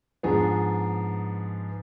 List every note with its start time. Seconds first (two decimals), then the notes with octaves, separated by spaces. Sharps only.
0.23 G#2 F3 B3 D4 G#4